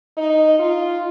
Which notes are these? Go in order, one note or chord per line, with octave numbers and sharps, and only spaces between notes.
D#4
F4